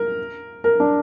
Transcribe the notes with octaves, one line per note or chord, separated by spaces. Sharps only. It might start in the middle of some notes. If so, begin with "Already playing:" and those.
Already playing: A#4
A#4
D4